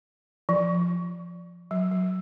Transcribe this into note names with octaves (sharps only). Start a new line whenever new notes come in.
F3
F#3
F#3